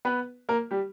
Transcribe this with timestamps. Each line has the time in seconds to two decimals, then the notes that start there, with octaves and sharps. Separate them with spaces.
0.05 B3 B4
0.49 A#3 A#4
0.71 G3 G4